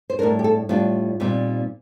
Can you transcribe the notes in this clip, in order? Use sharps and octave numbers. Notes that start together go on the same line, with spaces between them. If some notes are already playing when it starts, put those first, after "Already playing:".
C5
A2 G3 D4 A#4
G4
A4
A2 G3 D4 F4
A#2 G3 C4 D#4